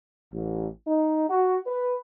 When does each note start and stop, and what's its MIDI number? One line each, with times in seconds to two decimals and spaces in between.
0.33 0.66 33
0.87 1.25 63
1.30 1.58 66
1.67 1.97 71